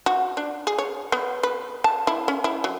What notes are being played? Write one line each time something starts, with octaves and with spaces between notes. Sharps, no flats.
F#4
D4
G#4
C#5
B3
B4
A5
E4
C#4
E4
F#3